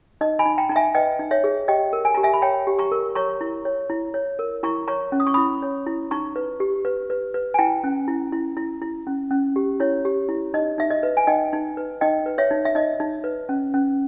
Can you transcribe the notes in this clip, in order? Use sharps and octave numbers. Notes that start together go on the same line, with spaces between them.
D#4 D#5
G#5 B5
D#4
G5 A#5
D#4 A#5
E5 G#5
B4 D#5 G5
D#4
C#5 E5
G#4
G4 D#5 G5
A#4
G#5
G4 A#5
E5 G#5
B5
C#5 G5 A#5
G4
A#5 C#6
A#4
C#5 A#5 C#6
E4
C#5
E4
C#5
A#4
E4 A#5 C#6
C#5 A#5 C#6
C#4
D#6
C#6
E4 B5 D#6
C#5
E4
D#4 A#5 C#6
B4
G4
B4
B4
B4
G#5
E4 G5 A#5
C#4
E4
E4
E4
E4
C#4
C#4
G4
E4 C#5
G4
E4
D#4 D#5
D#4 E5
D#5
B4
G#5
D#4 D#5 G5
D#4
B4
D#4 D#5 G5
B4
C#5 E5
D#4
E5
D#4 D#5
D#4
B4
C#4
C#4